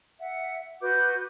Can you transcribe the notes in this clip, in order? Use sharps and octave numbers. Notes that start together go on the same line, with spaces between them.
E5 F#5
F#4 B4 D6 G6